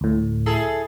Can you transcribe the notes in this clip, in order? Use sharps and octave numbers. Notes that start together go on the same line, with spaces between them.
D2 A2
E4 G#4 A4